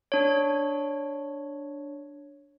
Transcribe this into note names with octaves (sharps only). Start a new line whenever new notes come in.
D4 C#5